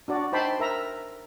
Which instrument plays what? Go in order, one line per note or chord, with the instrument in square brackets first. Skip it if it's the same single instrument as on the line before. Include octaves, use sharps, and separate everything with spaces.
[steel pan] D4 F#4 D5
D#4 C5 G5 A5 B5 C6
A#4 E5 A#5